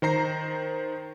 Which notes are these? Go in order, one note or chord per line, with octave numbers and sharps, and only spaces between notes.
D#3 C5 A#5 C7